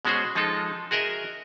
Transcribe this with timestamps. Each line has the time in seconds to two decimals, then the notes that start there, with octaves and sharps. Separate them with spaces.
0.05 B2 G#3 C#4 F#4 G#4 C5
0.35 F3 G#3 D#4 F4 A4
0.91 F#4 G#4 A#4 D#5 E5